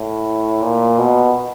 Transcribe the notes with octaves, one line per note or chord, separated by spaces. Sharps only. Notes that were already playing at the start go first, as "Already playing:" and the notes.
Already playing: A2
A#2
B2